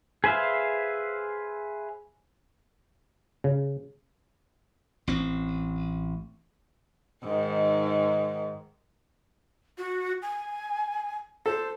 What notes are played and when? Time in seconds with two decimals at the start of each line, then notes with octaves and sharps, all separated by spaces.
0.24 G#4 B4 C5 E5 F5
3.44 C#3
5.07 A1 C4
7.24 G#2 D#3
9.78 F#4
10.22 G#5
11.46 A4 C5